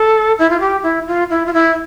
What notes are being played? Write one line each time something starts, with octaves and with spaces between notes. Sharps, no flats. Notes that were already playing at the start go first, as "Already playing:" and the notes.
Already playing: A4
E4
F4
G4
E4
F4
E4
F4
E4